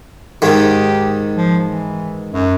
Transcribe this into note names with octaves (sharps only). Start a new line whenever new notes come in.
G#2 D#3 G4
F3
E3
F#2